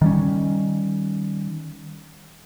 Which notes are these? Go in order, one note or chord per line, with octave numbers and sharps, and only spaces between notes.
D#3 G3 C#4